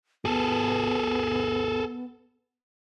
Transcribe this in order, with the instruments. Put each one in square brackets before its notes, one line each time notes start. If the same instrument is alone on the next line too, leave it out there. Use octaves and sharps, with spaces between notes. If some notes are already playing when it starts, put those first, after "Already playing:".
[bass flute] B3 [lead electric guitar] G#4 A4